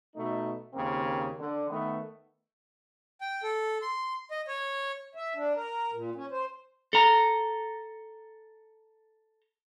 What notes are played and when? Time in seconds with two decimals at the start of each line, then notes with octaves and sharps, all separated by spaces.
0.16 B2 A3 D#4
0.74 D#2 C#3 A#3 C4
1.40 D3
1.70 D#3 A3 B3
3.21 G5
3.43 A4
3.82 C6
4.31 D#5
4.48 C#5
5.15 E5
5.36 D4
5.54 A#4
5.93 A#2
6.15 C#4
6.31 C5
6.93 A4 A#5